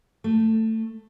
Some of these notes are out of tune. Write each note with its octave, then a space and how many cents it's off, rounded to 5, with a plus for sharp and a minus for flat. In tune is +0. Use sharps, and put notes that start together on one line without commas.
A3 +15